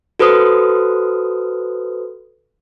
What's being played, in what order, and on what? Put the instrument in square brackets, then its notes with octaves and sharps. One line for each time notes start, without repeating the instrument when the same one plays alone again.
[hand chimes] F#4 A4 B4 C5 D#6